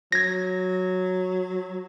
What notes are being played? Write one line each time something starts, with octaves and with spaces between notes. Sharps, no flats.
F#3 G#6 A#6